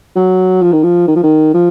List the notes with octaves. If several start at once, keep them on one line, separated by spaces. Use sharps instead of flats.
F#3
F3
D#3
F3
D#3
F3
D#3
F3